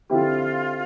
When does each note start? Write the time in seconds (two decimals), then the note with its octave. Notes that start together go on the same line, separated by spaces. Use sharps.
0.09 D3 F3 C4 E4 F4 G4